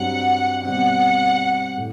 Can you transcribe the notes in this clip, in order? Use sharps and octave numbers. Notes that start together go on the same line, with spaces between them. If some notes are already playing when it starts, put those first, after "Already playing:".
Already playing: G2 F#3 C4 G4 F#5
B2 G3 C4 F#5
A2